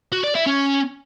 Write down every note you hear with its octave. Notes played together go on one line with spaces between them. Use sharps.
F#4
D5
E4
C#4